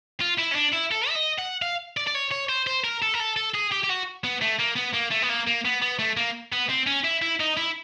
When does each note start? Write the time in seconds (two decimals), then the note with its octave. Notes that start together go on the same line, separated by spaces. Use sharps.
0.21 F4
0.39 E4
0.52 C#4
0.56 D4
0.73 E4
0.92 A4
1.09 E5
1.15 D#5
1.38 F#5
1.62 F5
1.97 D5
2.07 D5
2.15 C#5
2.31 C#5
2.49 C5
2.67 C5
2.84 A#4
3.02 A4
3.14 A#4
3.20 A4
3.36 A4
3.55 G#4
3.72 G4
3.84 G4
3.90 F#4
4.24 B3
4.42 A3
4.60 A#3
4.76 B3
4.94 A#3
5.11 A3
5.23 B3
5.29 A#3
5.47 A#3
5.65 B3
5.82 B3
5.99 A3
6.17 A#3
6.53 B3
6.69 C4
6.87 C#4
7.04 E4
7.22 E4
7.40 D#4
7.57 E4